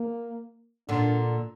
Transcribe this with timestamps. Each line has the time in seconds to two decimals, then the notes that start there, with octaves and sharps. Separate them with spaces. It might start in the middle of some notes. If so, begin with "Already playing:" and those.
Already playing: A#3
0.89 A#2 D3 D4